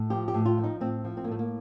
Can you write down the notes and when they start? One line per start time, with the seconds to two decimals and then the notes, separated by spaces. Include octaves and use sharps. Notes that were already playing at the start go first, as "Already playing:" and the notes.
Already playing: A2
0.10 F3 G4
0.28 G4
0.34 A2
0.45 F4
0.58 F3
0.64 D#4
0.80 A2 C4
1.04 F3
1.17 C4
1.24 A#3
1.28 A2 A3
1.39 A#3